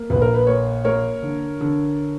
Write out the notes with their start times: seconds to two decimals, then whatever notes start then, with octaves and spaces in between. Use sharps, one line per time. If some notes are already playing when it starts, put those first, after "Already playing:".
Already playing: A#3
0.10 A#1 B4
0.22 A#4
0.34 B4
0.47 A#3 A#4 C#5
0.85 A#3 A#4 C#5
1.22 D3
1.61 D3